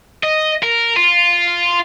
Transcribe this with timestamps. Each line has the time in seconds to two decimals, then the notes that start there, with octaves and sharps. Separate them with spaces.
0.23 D#5
0.63 A#4
0.97 F4